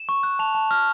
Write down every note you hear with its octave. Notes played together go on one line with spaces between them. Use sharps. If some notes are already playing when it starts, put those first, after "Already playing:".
Already playing: E7
C#6
F#6
A5 F7
A5
F6